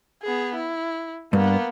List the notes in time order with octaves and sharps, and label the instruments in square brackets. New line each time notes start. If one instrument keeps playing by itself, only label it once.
[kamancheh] B3 G#4
E4
[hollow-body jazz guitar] G2 [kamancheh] A#3 B3